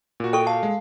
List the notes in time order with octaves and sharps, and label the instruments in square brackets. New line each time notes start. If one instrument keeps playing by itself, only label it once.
[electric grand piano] A#2 F#4
[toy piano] A4 C#6 [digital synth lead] G5
[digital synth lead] F5 [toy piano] A5
[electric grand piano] G#3